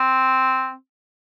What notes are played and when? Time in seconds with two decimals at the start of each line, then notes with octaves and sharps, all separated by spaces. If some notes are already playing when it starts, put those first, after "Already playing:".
Already playing: C4